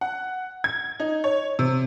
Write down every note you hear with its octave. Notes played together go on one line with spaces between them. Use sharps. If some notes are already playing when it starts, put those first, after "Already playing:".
F#5
G#6
D#4
C#5
C3